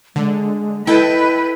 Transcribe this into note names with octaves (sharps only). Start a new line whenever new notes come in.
D3 G#3
E4 A4 B4 D#5 G5